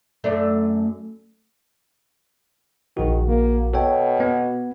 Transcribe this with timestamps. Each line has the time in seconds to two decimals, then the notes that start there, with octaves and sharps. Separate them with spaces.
0.24 F#2 A3 D4
2.97 A#1 D#3 F#4
3.27 A#3
3.74 B2 A4 C#5 G5
4.20 B3